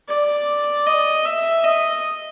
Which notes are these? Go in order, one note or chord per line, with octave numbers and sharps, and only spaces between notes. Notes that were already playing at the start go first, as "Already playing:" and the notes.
D5
D#5
E5
D#5